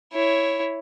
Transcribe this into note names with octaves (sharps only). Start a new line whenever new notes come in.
E4 C#5